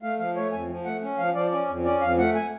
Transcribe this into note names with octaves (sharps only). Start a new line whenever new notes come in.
A3 F5
F3 F5
A3 C#5
F2 G#5
F3
A3 F#5
C#4
F3 F5
F3 D5
C#4 D5
F2
C#4 D5
F2 F5
A3 F#5
G#5